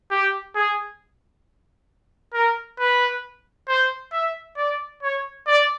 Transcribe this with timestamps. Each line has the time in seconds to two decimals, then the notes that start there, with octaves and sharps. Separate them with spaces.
0.11 G4
0.55 G#4
2.34 A#4
2.79 B4
3.68 C5
4.13 E5
4.57 D5
5.03 C#5
5.47 D5